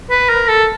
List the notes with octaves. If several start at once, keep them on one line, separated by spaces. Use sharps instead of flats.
B4
A#4
A4